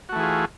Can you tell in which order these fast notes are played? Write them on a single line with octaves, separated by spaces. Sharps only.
F#4 A3 E3 G#4 F4